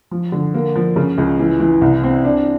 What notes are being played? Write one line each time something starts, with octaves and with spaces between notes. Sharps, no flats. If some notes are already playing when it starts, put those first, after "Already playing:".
F3
D3
A#3
F3
C#3
C#2
E3
E3
C2
C4
D4